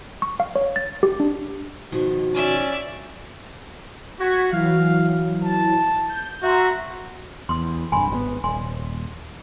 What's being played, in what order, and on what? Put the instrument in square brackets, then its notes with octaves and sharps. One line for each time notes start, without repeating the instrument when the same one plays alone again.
[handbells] C#6
F5
C#5
A6
G4
D4
[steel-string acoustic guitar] B2 D#3 F3 [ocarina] F#4
[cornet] C#4 [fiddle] D5 E5
[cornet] F#4 [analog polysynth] C#6 G#6 B6
[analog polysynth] E3 F#3 [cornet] F5
[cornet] A5
[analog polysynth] G6
[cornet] F#4 [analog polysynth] E5 A#5 C6
[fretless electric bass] E2 [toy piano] C6 D#6
[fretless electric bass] C2 G2 [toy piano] G#5 B5 C6
[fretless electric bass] G#1 D#3 B3
[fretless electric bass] D#1 [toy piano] G#5 C6